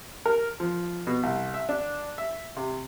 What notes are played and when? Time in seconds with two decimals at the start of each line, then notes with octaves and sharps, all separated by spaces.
0.26 A#4
0.60 F3
1.07 B2
1.23 C2
1.54 E5
1.69 D4
2.18 E5
2.56 C3